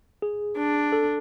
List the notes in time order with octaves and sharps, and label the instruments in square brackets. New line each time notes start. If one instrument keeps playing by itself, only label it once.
[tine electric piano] G#4
[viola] D4
[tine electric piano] A4